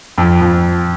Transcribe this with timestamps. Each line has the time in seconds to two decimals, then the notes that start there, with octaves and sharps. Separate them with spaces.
0.18 F2
0.41 F2